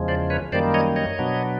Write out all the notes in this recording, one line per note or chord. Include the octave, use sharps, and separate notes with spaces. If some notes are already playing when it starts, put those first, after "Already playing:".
Already playing: E2 C#3 F3 G#3
C5 D5
B4 C#5
F#2 D#3 G3 A#3 C5 D5
C#5 D#5
C#5 D#5
B2 F#3 B3 D4